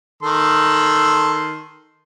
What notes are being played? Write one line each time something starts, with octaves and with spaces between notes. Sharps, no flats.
D#3 A4 C6